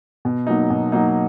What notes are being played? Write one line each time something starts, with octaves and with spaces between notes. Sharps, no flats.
B2
F#3 A#3 D#4
B2
F#3 A#3 D#4